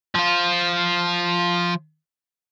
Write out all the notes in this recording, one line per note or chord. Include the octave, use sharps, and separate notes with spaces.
F3 F4